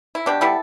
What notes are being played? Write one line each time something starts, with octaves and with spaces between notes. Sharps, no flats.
E4
B2 D4 G4
G3 B3 E4 A4